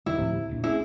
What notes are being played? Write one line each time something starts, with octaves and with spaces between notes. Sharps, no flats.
F1 C3 D#3 G3 E4
D2 A2 C3 F3
D#1 A#1
A3 C4 C#4 E4 G#4